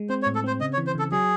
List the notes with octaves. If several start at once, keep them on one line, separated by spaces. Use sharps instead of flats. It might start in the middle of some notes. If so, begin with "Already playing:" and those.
Already playing: G#3
C4 C5
C#5
A2
A4
C4 C5
C#3 D#5
C#5
E3
C5
C#3 A4
F#3 G#4